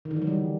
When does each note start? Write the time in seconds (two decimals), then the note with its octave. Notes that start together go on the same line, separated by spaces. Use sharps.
0.05 D#3
0.11 D3
0.16 E3
0.22 F#3
0.27 G3